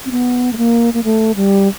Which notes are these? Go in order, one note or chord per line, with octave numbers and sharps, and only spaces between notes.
C4
B3
A3
A#3
A#3
A3
G3